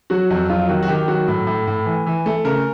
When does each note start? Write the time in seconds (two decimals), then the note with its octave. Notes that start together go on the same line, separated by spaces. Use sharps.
0.10 F#3 F#4
0.30 F2 F#4
0.49 F#3 F4
0.68 D#3 F#4
0.83 F#4
0.88 D#3 G4
1.08 F#3 F#4
1.28 A2
1.47 A2
1.67 A2
1.86 E3
2.07 E3
2.26 A3
2.44 C#3 A#4